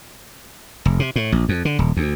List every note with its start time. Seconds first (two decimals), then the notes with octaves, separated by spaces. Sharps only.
0.85 F1
1.00 C3
1.16 A2
1.32 A#1
1.49 F2
1.65 D3
1.79 D#1
1.97 D2